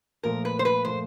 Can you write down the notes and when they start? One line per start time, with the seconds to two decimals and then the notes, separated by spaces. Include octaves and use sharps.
0.23 A#2 F3 A3 A#4
0.45 B4
0.59 C5
0.65 B4
0.85 A#2 F3 A3 C5